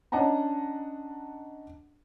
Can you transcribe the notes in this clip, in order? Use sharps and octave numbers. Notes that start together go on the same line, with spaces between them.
C#4 D4 D#5 F#5 A5 A#5